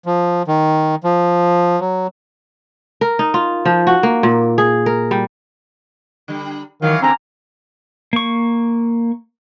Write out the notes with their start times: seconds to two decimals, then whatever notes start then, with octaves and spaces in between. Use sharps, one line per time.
0.06 F3
0.48 D#3
1.04 F3
1.80 F#3
3.01 A#4
3.19 D#4
3.34 F4
3.65 F3
3.87 F#4
4.03 A#3
4.23 A#2
4.58 G#4
4.86 A#4
5.11 G3
6.28 D3 G3
6.82 D#3 E3 F#3 F5
7.02 D3 A3 A#3 C4 C#4 A#5
8.13 A#3 C#6